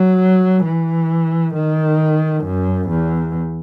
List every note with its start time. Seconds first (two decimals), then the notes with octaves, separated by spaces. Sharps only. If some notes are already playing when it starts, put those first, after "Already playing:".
Already playing: F#3
0.64 E3
1.54 D#3
2.44 F#2
2.90 E2